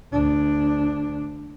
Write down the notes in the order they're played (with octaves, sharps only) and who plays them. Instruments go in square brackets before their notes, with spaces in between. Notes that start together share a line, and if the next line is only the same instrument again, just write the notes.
[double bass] D2 D4